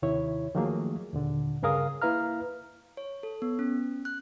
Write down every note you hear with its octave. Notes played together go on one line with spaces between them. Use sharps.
D#2 C3 D#3 E4 C#5
D#3 F3 F#3 A3 A#3 G#4
D#2 A#2 D3
G2 C#3 G#4 A#4 F5 D#6
A#3 E4 B4 F5 A#5 F6
C#5
A4
B3
C#4
F#6